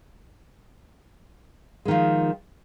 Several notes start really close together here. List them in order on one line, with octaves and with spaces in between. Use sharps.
G#3 D#3 F3